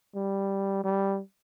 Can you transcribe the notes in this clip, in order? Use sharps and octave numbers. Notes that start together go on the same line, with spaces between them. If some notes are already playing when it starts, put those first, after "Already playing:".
G3
G3